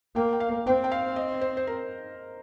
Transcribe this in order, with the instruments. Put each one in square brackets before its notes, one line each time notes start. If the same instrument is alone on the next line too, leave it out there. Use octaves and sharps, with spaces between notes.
[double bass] A#3 [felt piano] G5
[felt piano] G5
F5
[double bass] C4 [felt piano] G5
[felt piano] G5
F5
D#5
C5
C5
A#4